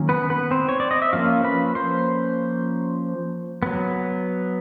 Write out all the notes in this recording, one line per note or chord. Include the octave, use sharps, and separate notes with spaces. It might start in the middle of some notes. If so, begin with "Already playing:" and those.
Already playing: D#3 F#3 A#3 C#4
B3 B4
B3 B4
C4 C5
C#5
D5
D#5
E5
F3 A#3 C#4 F4 F5
B4 B5
C5 C6
F#3 B3